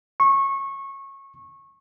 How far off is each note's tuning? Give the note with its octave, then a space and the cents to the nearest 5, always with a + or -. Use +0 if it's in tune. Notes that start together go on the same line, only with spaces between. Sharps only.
C#6 -20